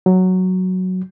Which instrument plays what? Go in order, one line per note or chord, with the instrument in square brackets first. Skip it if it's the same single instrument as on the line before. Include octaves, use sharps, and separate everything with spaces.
[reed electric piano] F#3